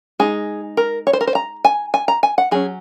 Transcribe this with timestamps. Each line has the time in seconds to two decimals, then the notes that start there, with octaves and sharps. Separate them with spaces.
0.20 G#3 D#4 G#4
0.77 A#4
1.07 C#5
1.13 C5
1.21 A#4
1.27 C5
1.35 A#5
1.65 G#5
1.94 G#5
2.08 A#5
2.23 G#5
2.38 F#5
2.51 F#3 C#4 G#4